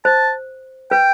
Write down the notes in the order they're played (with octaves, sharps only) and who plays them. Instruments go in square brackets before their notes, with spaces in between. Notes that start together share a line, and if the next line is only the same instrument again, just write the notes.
[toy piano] C5 [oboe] A5
[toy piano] B4 [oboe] G5